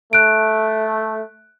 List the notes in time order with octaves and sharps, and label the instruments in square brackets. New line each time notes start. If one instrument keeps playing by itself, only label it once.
[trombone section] A3 [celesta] F#6 D7